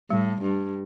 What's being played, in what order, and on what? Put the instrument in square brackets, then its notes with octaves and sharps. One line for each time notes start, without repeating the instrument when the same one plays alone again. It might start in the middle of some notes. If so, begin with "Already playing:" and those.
[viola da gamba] A2 [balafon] G3
[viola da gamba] G2